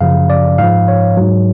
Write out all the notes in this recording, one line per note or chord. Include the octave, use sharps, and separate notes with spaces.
F#2 C#3 F3 F5
D5
G#2 F3 F5
C#5
G#2 F#3